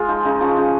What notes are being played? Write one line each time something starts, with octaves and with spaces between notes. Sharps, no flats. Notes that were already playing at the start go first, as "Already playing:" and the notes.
Already playing: G#3 F4 G#4
F3 D#4
C#3 D#4
F3 C#4
C#3 D#4